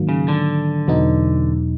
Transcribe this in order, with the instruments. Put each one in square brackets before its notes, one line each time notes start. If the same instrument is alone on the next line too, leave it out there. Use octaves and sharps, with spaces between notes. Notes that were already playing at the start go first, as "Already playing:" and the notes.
Already playing: [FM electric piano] G#2 D#3 F#3 A#3
[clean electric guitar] C#3
D3
[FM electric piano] E2 B2 F#3 B3 D#4